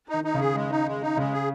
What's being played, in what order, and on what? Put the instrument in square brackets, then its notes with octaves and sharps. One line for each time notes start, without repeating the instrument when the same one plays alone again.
[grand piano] D#3 [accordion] D#4
[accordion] D#4
[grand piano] C#3
[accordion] G#4
G#3
D#4
G#3
D#4
[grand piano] C#3 [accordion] G#3
[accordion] G#4